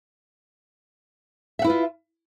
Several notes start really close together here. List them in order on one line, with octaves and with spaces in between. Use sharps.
E5 F#5 E4 B4 F4